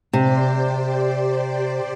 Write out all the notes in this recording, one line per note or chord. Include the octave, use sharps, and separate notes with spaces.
C3 G4 C5 D5